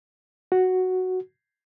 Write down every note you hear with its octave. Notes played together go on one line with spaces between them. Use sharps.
F#4